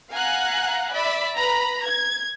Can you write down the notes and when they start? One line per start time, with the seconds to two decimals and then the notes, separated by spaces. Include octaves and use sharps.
0.11 F5 F#5 G#5 A#5 F#6
0.92 D5 E5 B5
1.36 B4 A#5 B5
1.84 G#6